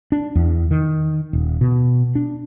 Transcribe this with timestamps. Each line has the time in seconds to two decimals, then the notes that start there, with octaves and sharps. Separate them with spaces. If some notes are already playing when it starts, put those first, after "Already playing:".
0.12 D4
0.35 E2
0.71 D#3
1.33 D#1
1.61 B2
2.15 D4